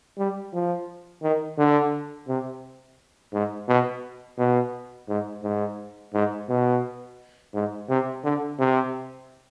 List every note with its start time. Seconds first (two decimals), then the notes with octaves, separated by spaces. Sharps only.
0.18 G3
0.53 F3
1.23 D#3
1.58 D3
2.28 C3
3.33 G#2
3.68 B2
4.38 B2
5.08 G#2
5.43 G#2
6.14 G#2
6.49 B2
7.54 G#2
7.89 C3
8.24 D3
8.59 C3